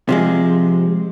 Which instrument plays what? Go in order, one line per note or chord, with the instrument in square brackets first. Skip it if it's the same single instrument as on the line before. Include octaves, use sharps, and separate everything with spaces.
[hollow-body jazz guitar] C3 F3 G#3